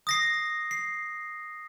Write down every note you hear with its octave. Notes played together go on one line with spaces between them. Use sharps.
D#6 A#6 C7
C7